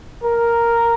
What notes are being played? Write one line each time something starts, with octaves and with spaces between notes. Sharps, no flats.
A#4